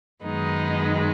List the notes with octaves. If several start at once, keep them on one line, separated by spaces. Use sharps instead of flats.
F#2 D#3 G#3 B3 D#4